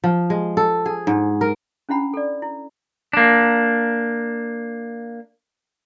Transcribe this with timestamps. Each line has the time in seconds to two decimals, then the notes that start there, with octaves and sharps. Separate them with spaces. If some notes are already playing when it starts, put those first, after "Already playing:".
0.04 F3
0.30 G#3
0.57 A4
0.86 G#4
1.07 G#2
1.41 A#4
1.89 C#4 D4 E4 F#5 B5
2.14 A4 D5
2.42 E4
3.13 A#3 D4